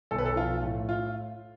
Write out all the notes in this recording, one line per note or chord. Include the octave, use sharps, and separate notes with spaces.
B1 A4
B4
A4
F3 F4
A2
F4